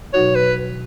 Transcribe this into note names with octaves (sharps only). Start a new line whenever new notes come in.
B2 F#3 D#4 F#4 C#5
B4